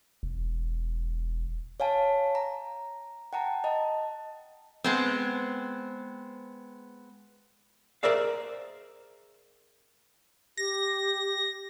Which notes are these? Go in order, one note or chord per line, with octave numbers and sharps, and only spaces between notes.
E1
C#5 F5 G#5 A5
A#5
F#5 G5 A5 A#5
D#5 A5
G#3 B3 C4
G#4 A#4 C5 D5 E5 F5
G4 A#6